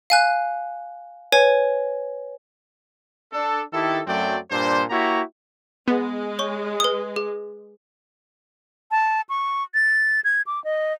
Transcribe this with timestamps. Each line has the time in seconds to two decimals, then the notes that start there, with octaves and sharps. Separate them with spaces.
0.10 F5 G#5 F#6
1.32 B4 C#5 G#5
3.32 D4 A4
3.73 D#3 E4 G4 A4
4.07 F#2 F#3 A3 C4 D5 G5
4.50 G2 A#2 D4 C5
4.89 A#3 E4 F#4 G4 C#5 A#5
5.88 G#3 B3
6.39 C#5 C#6
6.80 B4 D#6
7.16 G#4
8.91 A5
9.29 C#6
9.74 A6
10.24 G#6
10.47 D6
10.64 D#5